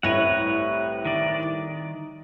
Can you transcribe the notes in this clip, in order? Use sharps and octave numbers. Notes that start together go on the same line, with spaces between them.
C2 A2 B4 C#5 F#5 A#6
D#3 D5